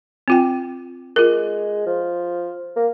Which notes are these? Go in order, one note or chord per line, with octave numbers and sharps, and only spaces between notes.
C4 F4 G5
G#3 F4 A#4
F3
A#3